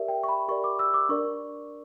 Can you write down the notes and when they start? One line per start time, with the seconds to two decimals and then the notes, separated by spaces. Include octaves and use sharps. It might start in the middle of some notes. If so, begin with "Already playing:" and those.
Already playing: G4 A#4 D5 E5
0.08 G5
0.23 C#6
0.29 B5
0.48 G4 A#4 D5 C#6
0.64 D6
0.79 E6
0.94 D6
1.09 D4 A#4 D5 C#6